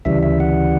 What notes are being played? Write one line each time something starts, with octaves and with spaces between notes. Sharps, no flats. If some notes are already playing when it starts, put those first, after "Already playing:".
D2 C#3 E3 G3 E5
E5
F#5